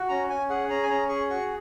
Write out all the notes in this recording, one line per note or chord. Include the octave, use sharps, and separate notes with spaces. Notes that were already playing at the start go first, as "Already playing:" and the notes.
Already playing: F#4
C#4 A#5
C#4 G#5
G#4 F#5
C#4 A#5
G#5
C#4 A#5
G#4 C#6
F#4 C#6